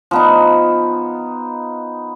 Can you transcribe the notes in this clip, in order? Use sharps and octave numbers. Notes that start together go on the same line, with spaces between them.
F3 B3 D#4